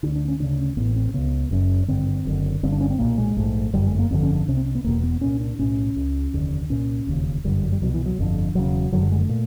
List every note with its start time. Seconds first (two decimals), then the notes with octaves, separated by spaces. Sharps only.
0.03 D2 D3 D4
0.15 D4
0.28 C#4
0.39 D2 C#3 D4
0.59 C#4
0.77 A1 A2 B3
0.96 C4
1.14 C#2 C#3 B3
1.51 F#1 F#2 C#3
1.88 G#1 G2 D3 C4
2.25 F#1 F#2 D3
2.63 G1 G2 D3 C4
2.72 D4
2.81 C#4
2.90 C4
2.99 B1 A#2 A#3
3.18 G#3
3.37 A#1 G#2 A3
3.73 G1 F#2 D3 G3
3.86 G#3
3.99 A#3
4.11 G1 F2 D3 C4
4.23 C#4
4.35 D4
4.48 C2 C3 C#4
4.57 C4
4.66 C#4
4.75 B3
4.84 E1 E2 B2 A#3
5.03 B3
5.21 C2 A#2 C#4
5.41 D4
5.59 B1 A2 C#4
5.96 C#2 C#3
6.33 F1 D#2 D3
6.69 C2 A#2 C#4
7.07 E1 D#2 C#3
7.44 G1 F#2 D3 G3
7.63 F#3
7.72 G3
7.82 C2 B2 F#3
7.94 E3
8.06 F#3
8.19 G1 F2 D3
8.55 E1 E2 C#3 F#3
8.92 F#1 F#2 D3 F#3
9.01 G3
9.12 G#3
9.20 A3
9.29 A#2